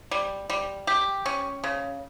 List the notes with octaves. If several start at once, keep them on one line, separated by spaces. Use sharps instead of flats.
G3
G3
G4
C#4
C#3